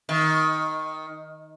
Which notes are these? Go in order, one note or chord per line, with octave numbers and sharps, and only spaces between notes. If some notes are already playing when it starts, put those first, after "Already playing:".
D#3